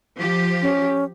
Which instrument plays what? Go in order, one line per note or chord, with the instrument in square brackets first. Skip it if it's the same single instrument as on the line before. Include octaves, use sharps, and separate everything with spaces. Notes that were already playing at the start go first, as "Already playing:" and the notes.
[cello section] F3 G4
[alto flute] C#4